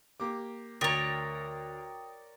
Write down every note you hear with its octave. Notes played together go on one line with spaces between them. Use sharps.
A#3 G4 D6
D2 A#4 C#5 D5 G5 A#5 D#6 A6